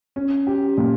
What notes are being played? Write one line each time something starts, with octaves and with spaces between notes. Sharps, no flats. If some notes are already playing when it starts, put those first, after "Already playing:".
C#4
G4
A#2